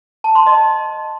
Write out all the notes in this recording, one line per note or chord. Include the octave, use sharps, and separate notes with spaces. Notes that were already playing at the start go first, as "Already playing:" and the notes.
A5
C6
D#5